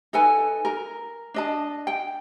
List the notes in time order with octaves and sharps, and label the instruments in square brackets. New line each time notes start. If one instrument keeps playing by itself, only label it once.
[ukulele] D#4 A4 B4 G#5
A#4
D4 D#5 A5
G5